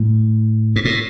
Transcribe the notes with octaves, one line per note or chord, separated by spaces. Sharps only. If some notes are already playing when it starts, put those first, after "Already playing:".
Already playing: A2
G#2
A2